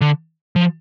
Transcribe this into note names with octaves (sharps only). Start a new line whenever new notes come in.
D3
F3